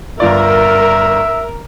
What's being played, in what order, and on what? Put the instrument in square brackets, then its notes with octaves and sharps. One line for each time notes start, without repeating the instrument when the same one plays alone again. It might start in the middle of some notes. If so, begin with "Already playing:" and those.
[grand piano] G1 F4 D5 [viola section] A#4 [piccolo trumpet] E5